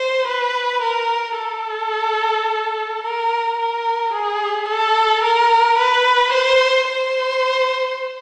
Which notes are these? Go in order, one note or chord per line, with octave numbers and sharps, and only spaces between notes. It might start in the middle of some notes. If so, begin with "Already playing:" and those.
Already playing: C5
B4
A#4
A4
A#4
A#4
G#4
A4
A#4
B4
C5
C5